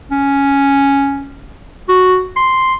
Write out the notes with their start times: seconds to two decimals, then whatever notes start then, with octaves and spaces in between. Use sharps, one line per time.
0.11 C#4
1.89 F#4
2.36 C6